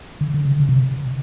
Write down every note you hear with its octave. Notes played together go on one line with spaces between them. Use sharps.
D3
D3
C#3
C#3
C3